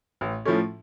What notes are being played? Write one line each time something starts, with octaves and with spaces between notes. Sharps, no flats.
A1
A2 F3 A3 C#4